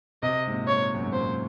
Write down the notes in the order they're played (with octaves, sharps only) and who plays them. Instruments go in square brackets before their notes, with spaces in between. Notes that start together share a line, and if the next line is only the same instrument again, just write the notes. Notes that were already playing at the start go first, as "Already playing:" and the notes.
[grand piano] C3 [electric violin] D#5
[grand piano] G#2
A#2
[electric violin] C#5
[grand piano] F#2
G#2
[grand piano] A#2 [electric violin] C5